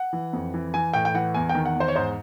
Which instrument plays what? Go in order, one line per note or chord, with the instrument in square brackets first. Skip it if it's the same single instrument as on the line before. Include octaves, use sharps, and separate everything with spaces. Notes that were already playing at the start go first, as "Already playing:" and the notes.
Already playing: [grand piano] F#5
E3
F2
E3
E3 G#5
A2 G5
G5
E3 F#5
E2 G#5
G5
D#3
F#5
E2
C5
C#5
G#2 C5